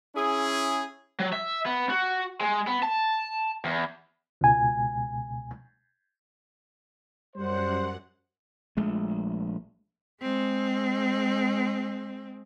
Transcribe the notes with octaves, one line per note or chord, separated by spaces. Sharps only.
C#4 E4 G#4
F#3
E5
B3
F#4
G#3
B3
A5
E2
C#2 B2 G#5
F#2 G3 C5 F#5
A#1 G#3 A3
G#3 C4